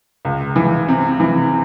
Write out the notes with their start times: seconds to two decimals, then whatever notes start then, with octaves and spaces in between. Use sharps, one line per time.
0.25 C#2
0.56 E3
0.88 C3
1.20 E3